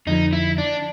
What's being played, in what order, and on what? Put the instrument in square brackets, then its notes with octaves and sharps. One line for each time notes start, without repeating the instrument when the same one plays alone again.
[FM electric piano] F2 D3 F3 [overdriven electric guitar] D#4
[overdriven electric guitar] E4
D4